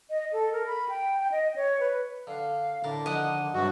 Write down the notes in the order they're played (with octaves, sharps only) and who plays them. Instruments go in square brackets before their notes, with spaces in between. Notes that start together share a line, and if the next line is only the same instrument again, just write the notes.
[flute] D#5
A4
A#4
B5
G5
G5
D#5
C#5
B4
[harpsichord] D3 [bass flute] F5
[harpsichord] A2 A#4 A5 [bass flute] D3
[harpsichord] D#3 F3 [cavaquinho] D#5 F#5
[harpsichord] C#2 C3 [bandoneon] G2 F#4 [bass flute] F#3